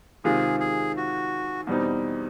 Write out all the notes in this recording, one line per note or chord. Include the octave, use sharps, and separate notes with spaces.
C3 D#3 G#3 C4 F4 G#4
G#4
F#4
E2 B2 G3 C4 D#4